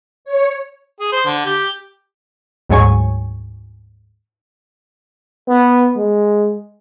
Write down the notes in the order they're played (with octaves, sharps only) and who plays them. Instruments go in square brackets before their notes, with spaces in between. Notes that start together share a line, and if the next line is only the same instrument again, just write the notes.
[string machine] C#5
[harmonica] G#4
C5
D3
G4
[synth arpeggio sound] D2 G#2 F#3 C#5 G#5 C#6
[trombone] B3
G#3